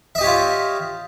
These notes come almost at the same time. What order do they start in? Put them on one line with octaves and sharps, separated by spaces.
E5 D#5 G4 C#5 F4